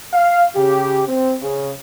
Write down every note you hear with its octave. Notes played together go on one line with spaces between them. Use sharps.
F5
C#3 G4
C4
C#3